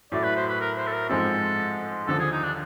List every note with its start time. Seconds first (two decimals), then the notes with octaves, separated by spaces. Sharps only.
0.12 A2 F#3 A3 D5
0.24 B4
0.36 C5
0.49 B4
0.60 A#4
0.77 C5
0.87 A4
0.93 A#4
1.09 G#2 F3 G#3 C4 A4
2.07 D#2 D3 F3 A4
2.20 G#4
2.32 D#4
2.44 D4